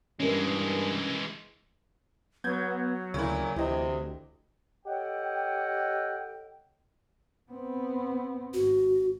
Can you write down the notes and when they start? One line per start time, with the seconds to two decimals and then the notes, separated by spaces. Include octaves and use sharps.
0.20 G2 E3 G#3 C#4 A#4
2.44 F#3 B3 G6 G#6
3.14 D2 A#2 C#3 E4
3.56 D2 C3 E3 D#5
4.86 G4 A4 C#5 D#5 F#5 G5
7.52 B3 C4
8.54 G#1 F#4